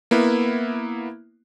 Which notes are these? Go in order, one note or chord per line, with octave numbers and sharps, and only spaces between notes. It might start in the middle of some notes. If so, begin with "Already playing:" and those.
A#3 B3 E4